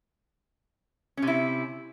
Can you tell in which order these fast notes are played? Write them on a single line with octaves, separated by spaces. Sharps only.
C#4 C3 E4